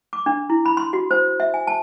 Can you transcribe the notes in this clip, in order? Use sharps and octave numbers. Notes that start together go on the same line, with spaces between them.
D6
D4
E4
B5
C6
F#4
C5
E5
G#5
A5